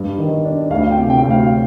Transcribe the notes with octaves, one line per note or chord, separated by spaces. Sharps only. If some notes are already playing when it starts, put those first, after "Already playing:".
Already playing: G2
D#3
D4
D2 F5
G5
C3
G5
D2
F5